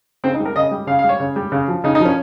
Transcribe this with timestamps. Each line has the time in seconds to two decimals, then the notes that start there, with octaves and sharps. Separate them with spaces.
0.24 C#3 C4
0.34 D#4
0.40 G3
0.45 A#4
0.56 C#3 D#5
0.71 G3
0.87 C#3 F5
0.99 F5
1.04 G3
1.09 C#5
1.20 C#3
1.36 G3
1.52 C#3
1.68 F3
1.84 C#3 D#4
1.95 D#4
2.00 F3
2.05 C#4